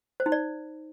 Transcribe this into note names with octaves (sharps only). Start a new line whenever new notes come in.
C5
D#4
D5